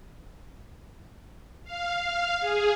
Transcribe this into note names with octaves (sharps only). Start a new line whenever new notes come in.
F5
F5
G#4